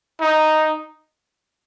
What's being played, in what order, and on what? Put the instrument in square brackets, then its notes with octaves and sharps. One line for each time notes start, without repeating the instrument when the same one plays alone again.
[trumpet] D#4